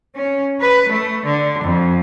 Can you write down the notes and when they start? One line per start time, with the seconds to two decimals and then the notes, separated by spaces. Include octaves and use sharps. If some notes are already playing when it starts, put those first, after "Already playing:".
0.15 C#4
0.60 B4
0.90 A3
1.26 D3
1.62 F2